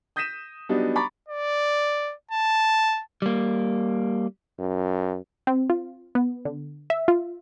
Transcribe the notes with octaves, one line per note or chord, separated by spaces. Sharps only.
D#6 G6 A#6 B6 D#7 E7
F#3 G3 B3 D4 D#4
A#5 B5 C#6 D6 A6
D5
A5
G3 A#3
F#2
C4
F4
B3
D3
E5
F4